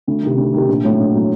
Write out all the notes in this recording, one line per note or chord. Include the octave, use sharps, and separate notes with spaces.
D2
C3 D#3
D2
C3 D#3
A#1
A2 F#3
A#1
A2 F#3